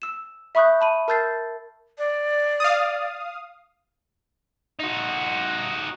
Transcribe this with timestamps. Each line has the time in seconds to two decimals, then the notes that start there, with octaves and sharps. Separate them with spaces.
0.02 E6 E7
0.55 E5 B5 C#6 D#6 F#6 G6
0.81 A5 B5 D#7
1.08 A#4 A5 E6 G6 A6 C7
1.98 D5
2.60 F5 D#6
4.79 D#4 F#4